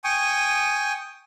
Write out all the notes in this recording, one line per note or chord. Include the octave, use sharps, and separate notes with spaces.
G5 G#5 C#6 D#6